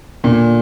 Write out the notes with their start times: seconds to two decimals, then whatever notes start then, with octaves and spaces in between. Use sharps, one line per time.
0.24 A#2 D3